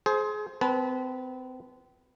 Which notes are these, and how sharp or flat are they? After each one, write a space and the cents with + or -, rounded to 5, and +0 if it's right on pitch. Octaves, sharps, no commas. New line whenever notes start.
G#4 +30 C5 +0
C4 -35 B4 -10 A5 -35